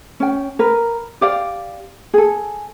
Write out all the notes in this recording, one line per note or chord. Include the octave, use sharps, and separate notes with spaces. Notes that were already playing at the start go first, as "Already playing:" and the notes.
C#4 G5
A#4 B4
G4 D5 F5
G#4 A4